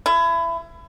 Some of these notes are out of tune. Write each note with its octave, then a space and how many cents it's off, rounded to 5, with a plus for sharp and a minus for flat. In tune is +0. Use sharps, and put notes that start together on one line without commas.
E4 +25